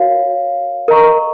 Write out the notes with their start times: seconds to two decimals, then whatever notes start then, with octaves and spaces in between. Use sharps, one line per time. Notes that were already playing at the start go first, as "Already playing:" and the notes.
Already playing: F#4 A#4 C#5 F5
0.88 A#4 D#5 A#5 C#6